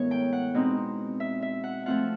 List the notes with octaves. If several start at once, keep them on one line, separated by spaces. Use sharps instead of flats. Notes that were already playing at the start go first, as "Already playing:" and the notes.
Already playing: A2 E3 G#3 B3 A#4 C#5
G5
F#5
B2 G#3 C4 D#4
E5
E5
F#5
F3 A3 C4 F4 F#5